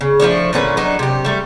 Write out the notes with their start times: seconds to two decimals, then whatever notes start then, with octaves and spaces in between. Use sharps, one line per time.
0.01 C#3
0.20 F3 G#3 A3 D4
0.53 A#2 D3 C#4 B4
0.77 F#3 D4 D#4
0.99 C3 G4
1.25 G3 A3